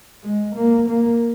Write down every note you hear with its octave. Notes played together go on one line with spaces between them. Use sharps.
G#3
A#3
A#3